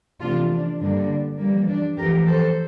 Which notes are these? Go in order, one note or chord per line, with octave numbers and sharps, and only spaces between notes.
E2 C3 F3 A3 D4 F4
D4
G2 D3 G3 A#3 D4
F2 E3 G3 A#3
D4
F2 E3 A3 G4 A#4
A4 C5